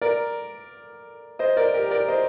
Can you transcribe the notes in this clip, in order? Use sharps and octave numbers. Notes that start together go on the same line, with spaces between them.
A#4 D5
C5 D#5
A#4 D5
G4 A#4
A#4 D5
C5 D#5